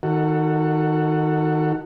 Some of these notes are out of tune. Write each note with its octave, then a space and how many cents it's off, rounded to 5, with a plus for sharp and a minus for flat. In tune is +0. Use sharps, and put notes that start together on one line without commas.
D#3 +10 F#4 +0 A4 +30